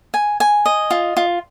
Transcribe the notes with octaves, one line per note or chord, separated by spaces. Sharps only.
G#5
G#5
D#5
F4
F4